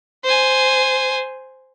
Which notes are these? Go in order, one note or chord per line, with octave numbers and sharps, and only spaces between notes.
C5 G#5